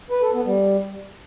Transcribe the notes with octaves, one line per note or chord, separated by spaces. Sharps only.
B4
A4
B3
G3